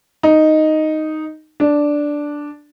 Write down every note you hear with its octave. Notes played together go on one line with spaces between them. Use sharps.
D#4
D4